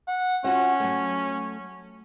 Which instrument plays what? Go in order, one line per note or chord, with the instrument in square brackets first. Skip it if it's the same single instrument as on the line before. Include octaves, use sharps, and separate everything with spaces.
[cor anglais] F#5
[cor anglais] C#4 [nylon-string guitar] F4 F#4 F#5
[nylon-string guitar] F#3 A3